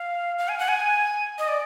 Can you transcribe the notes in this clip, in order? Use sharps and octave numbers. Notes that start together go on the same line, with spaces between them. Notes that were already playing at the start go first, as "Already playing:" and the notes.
Already playing: F5
F5
G#5
F#5
G#5
D#5
D5